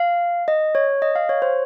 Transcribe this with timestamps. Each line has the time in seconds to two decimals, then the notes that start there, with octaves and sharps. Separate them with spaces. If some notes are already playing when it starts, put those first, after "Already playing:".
Already playing: F5
0.48 D#5
0.75 C#5
1.02 D#5
1.15 F5
1.29 C#5
1.42 C5